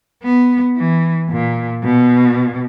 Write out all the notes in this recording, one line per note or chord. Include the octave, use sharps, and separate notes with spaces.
B3
E3
A#2
B2